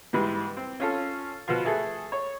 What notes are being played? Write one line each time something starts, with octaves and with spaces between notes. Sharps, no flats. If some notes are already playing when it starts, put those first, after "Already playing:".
G#2 E3 G3 G#3
C4
C#4 F4 A4
B2 F3 F4
A3 G#4 A4
C#5